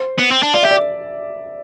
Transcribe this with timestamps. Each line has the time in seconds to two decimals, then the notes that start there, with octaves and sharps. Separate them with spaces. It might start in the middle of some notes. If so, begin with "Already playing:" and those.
Already playing: C5
0.19 B3
0.31 C4
0.43 D4
0.54 F4 D5
0.63 G4 E5
0.71 D5